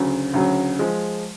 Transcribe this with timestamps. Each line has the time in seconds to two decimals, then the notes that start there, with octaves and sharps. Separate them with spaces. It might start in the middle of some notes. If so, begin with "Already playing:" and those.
Already playing: D2 C#3 F#3
0.34 D2 C#3 F#3
0.79 F3 G#3